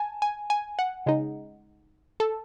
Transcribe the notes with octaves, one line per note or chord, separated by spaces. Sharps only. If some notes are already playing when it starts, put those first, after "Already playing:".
Already playing: G#5 A5
G#5
G#5
F#5
C#3 G#3 D#4
A4